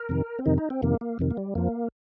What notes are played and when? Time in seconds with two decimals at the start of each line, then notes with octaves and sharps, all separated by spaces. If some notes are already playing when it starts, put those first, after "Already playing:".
Already playing: A#4
0.09 F2 C3 D#3
0.39 C4
0.46 F2 C3 D#3 D#4
0.58 D#4
0.70 C4
0.82 F2 C3 D#3 A#3
1.01 A#3
1.19 F2 C3 D#3
1.31 A#3
1.37 G3
1.55 F2 F3 A#3